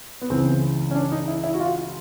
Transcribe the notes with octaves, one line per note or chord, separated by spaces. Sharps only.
B3
C#2 C#3 E3 C4
C#4
D4
D#4
E4
E4
F#4
F4